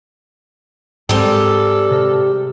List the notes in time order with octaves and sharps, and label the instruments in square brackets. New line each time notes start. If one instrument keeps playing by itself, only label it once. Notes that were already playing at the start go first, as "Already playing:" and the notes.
[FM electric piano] G#2 [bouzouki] G3 G4 [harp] G#3 C4 A#4 [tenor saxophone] A4
[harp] C3 F6 A#6